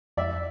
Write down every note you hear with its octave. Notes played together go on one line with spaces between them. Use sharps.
F2 D5 E5